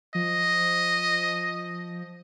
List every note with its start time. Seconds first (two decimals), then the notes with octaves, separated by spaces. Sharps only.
0.15 F3 D#5